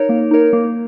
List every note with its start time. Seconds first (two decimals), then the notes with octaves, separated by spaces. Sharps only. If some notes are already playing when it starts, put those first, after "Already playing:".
Already playing: D#4 A#4 C#5
0.09 A#3
0.31 D#4 A#4 C#5
0.53 A#3